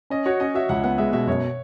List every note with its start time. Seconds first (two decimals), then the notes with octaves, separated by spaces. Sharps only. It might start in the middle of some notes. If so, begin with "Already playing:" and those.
0.10 C#4 D#5
0.26 F#4 C#5
0.40 C#4 D#5
0.55 F#4 E5
0.69 C#2 F#5
0.83 B3 F#5
0.98 G#3 E5
1.12 B2 E5
1.27 F#2 C#5